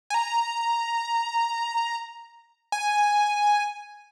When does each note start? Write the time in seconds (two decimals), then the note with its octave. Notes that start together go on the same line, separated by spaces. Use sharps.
0.10 G#5
0.14 A#5
2.72 G#5